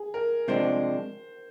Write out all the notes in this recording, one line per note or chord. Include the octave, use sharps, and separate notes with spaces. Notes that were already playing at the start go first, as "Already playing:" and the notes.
Already playing: G#4
A#4
C3 F3 G#3 D4 C5